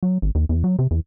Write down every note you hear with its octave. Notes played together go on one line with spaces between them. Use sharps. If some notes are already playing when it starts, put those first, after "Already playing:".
F#3
G#1
D#2
E2
F#3
C3
E2